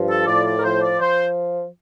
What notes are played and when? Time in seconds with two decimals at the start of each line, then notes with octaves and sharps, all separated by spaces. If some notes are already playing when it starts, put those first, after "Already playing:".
Already playing: G2 F3
0.10 A4
0.27 A2 D5
0.46 D5
0.58 A#4
0.63 F3 C5
0.82 D5
0.99 F3 C5